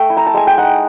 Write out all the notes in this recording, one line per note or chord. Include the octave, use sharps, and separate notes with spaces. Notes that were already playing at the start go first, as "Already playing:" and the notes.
Already playing: A3 G5
E4
A#5
A5
G#3 G#5
G5
D#4 F#5